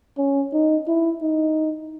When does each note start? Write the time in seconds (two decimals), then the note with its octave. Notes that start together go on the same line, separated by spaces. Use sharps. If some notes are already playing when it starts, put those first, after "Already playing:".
0.18 C#4
0.53 D#4
0.88 E4
1.22 D#4